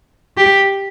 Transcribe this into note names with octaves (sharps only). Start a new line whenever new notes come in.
G4